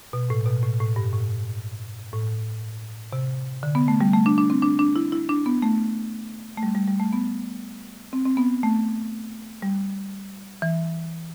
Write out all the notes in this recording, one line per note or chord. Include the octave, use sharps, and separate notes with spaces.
B2
A2
B2
A2
A2
G2
A2
A2
C3
D3
B3
A3
G3
A3
D4
D4
C4
D4
D4
E4
E4
D4
B3
A3
A3
G3
G3
G3
A3
B3
C4
C4
B3
A3
G3
E3